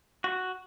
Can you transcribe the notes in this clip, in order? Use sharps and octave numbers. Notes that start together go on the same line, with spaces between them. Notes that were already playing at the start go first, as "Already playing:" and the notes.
F#4